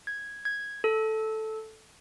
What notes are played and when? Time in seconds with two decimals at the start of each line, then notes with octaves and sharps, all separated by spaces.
0.07 G#6
0.45 G#6
0.84 A4